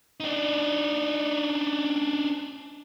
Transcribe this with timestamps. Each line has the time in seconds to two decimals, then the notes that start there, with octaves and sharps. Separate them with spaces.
0.20 D4 D#4